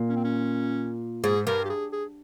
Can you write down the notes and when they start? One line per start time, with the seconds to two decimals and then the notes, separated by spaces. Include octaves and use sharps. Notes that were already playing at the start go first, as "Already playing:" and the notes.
Already playing: A#2
0.09 C#4
0.16 C4
0.24 C#4
1.24 G#2 G#4
1.47 G2 A#4
1.65 G4
1.70 G#4
1.93 G#4